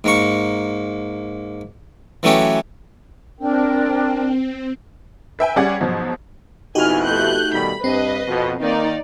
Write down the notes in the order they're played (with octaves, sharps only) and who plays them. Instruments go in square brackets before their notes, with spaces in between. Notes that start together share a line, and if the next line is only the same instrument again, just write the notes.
[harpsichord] G#2 A#3 C#6
E3 F#3 A3 C#4 G4
[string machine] C4 [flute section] D4 A#4 G5
[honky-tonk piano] B4 E5 G5 G#5
G3 C#4 G#4 D5 F#5 G#6
G#2 B2 F3 F#3
[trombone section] F2 B2 E4 [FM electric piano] D#4 F#4 G4 [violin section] G#5 F6
[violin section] A3 F#6 G6
[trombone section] B2 D#3 G3 [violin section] B5
[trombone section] G2 [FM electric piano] C4 [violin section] B4 D#5
[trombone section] F2 B2
[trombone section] D#3 A#3 [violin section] D#4 D5